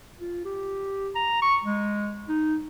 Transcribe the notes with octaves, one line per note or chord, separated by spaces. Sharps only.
F4
G4
A#5
C#6
G#3
D#4